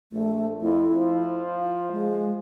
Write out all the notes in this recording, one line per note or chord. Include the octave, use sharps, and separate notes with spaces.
A#1 A3
F2 E4
F3
F5
G#3